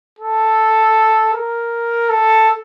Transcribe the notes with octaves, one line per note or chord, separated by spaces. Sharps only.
A4
A#4
A4